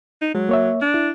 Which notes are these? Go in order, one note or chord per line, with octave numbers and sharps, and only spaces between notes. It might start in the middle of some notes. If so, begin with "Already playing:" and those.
D#4
F#3 G#3
A#3 C#5 E5
D4
E4